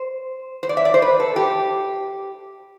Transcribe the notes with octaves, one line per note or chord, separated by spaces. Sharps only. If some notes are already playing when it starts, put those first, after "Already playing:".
Already playing: C5
C5
D5
E5
D5
C5
B4
A4
G4